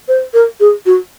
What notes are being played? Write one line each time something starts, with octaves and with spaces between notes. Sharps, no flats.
C5
A#4
G#4
F#4